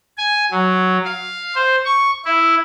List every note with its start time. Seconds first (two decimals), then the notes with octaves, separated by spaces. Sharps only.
0.18 G#5
0.51 F#3
1.05 F5
1.55 C5
1.85 C#6
2.25 E4